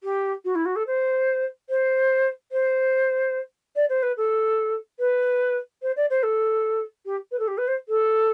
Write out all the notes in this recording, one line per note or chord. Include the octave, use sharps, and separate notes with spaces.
G4
F#4
E4
F#4
A4
C5
C5
C5
D5
C5
B4
A4
B4
C5
D5
C5
A4
G4
B4
A4
G4
B4
C5
A4